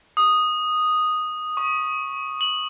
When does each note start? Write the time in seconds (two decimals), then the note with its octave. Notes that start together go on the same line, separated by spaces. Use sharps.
0.17 D#6
1.57 C#6
2.41 F#7